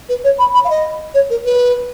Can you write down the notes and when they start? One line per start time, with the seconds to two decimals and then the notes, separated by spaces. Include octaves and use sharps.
0.09 B4
0.24 C#5
0.39 B5
0.54 B5
0.65 F5
0.70 D#5
1.14 C#5
1.30 A#4
1.45 B4